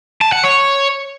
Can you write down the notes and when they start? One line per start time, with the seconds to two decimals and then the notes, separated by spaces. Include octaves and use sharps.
0.21 A5
0.32 F#5
0.44 C#5